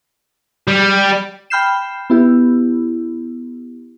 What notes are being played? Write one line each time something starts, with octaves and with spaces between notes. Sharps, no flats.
G3
G5 B5 F6 G6 C7 E7
B3 E4 G4